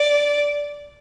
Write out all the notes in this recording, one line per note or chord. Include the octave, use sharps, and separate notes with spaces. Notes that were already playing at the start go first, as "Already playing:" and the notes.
Already playing: D5